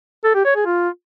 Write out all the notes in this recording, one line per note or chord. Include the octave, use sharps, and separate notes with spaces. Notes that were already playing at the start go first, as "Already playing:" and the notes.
A4
G4
C#5
G#4
F4